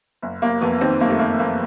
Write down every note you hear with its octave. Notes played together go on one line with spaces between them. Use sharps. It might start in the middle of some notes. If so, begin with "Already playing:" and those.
F#1
F#1 A#3
F2 B3
D#3 C4
F#1 A#3
A3
F#1 A#3
F#1 A#3